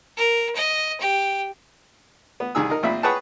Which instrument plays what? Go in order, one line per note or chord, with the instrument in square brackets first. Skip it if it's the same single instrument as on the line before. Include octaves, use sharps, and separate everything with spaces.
[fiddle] A#4
D#5
G4
[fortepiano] B3
C2 D#3 G#4 E6
D#4 A#4
A#1 C4 E5 B5
G#4 B4 C#5 F#5 G5 A5